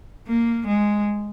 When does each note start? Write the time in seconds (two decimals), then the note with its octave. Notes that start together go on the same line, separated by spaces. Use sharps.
0.27 A#3
0.67 G#3